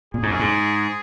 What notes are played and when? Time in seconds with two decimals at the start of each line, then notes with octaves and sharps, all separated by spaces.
0.14 A#2 G#4
0.23 G#2
0.30 F#2
0.39 G#2